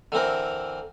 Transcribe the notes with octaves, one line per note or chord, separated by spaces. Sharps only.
D3 E3 C4 A#4